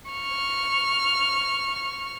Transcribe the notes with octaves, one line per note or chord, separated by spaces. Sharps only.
C#6 F6